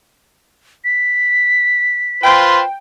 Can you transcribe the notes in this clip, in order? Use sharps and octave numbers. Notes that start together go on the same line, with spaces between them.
B6
F4 B4 C5 G5